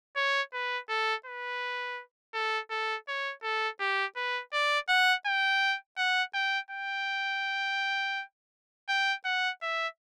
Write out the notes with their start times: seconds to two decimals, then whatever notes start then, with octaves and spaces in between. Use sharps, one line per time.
0.16 C#5
0.53 B4
0.89 A4
1.26 B4
2.34 A4
2.71 A4
3.08 C#5
3.43 A4
3.80 G4
4.16 B4
4.53 D5
4.89 F#5
5.26 G5
5.97 F#5
6.34 G5
6.71 G5
8.89 G5
9.25 F#5
9.62 E5